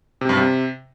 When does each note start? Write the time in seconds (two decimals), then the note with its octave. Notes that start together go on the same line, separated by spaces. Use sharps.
0.21 C3
0.29 G2
0.37 C3